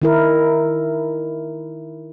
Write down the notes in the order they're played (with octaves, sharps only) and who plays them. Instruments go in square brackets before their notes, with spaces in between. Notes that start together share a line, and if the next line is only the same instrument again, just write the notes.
[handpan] D#3 E4 A#4